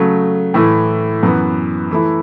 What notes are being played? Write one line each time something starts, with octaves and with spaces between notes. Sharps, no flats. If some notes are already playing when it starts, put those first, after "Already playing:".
Already playing: C#3 F#3 A3
A2 E3 A3 E4
F#2 E3 B3
E3 A3 E4